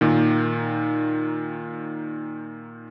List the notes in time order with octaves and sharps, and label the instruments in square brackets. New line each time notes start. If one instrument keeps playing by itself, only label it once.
[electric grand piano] A#2 D#3